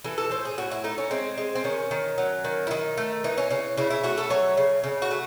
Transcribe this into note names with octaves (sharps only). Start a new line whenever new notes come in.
E3 A4
A4
A2 C5
G#4
A2 F#4
E4
A3 D#4
C#4
G#3 C4
G#3
C4
D#3 C#4
D#3
F#3
D#3
E4
D#3 D#4
A3
E3 D#4
C#4
C#3 C#4
C#3 E4
E4
A3 F#4
A4
F#3 C#5
C#3
C#3
F#4
A3